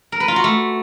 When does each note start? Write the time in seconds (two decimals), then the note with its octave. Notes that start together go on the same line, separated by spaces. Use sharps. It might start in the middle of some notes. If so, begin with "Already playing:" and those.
0.12 A#4
0.20 B4
0.28 F4
0.36 F#4
0.44 A3